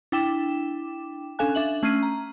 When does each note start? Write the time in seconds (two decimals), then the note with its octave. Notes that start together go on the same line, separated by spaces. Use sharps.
0.12 D4 E4 G5 D6 E7
1.39 C#4 D4 A4 F5 G#5 F#6
1.55 D4 E5 F#7
1.83 A3 C#4 F6 C7 D#7
2.03 A#5